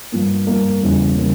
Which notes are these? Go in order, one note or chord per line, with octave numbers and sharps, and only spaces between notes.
G2 F3 A#3
G2 F3 A#3
E2 C#3 G3 A#3
C#3 G3 A#3